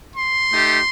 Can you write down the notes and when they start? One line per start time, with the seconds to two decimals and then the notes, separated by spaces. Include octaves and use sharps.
0.16 C6
0.53 A3 D#4 G4